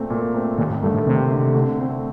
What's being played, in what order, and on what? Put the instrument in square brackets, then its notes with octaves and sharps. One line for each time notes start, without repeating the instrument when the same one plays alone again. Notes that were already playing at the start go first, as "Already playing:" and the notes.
Already playing: [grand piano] A#2 A3 C4
A#2
A3 C4
[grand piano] D#2 [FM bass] A#2
[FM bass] A2
[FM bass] G2 [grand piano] D3 A3
[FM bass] A2
[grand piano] D#2 [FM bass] C3
[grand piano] D3 A3
D3
A3 C4